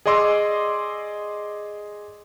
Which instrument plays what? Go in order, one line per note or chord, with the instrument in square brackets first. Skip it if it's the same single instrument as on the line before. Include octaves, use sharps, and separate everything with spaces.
[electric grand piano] G#4 D5 D#5 C6 D6 E6